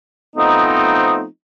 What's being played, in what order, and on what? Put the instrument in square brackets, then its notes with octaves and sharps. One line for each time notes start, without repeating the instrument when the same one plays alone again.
[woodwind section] F3 A3 B3 C4 D#4